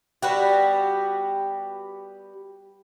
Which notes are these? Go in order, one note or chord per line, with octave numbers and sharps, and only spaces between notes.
G3 B3 F#4 G4